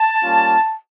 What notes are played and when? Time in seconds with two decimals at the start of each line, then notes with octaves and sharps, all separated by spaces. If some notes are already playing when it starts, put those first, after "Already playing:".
Already playing: A5
0.23 G3 A#3 C#4 F4